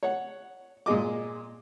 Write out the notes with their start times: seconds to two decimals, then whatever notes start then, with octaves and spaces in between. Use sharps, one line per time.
0.03 C#5 F#5
0.86 A#2 G#3 G#4 D#5 D6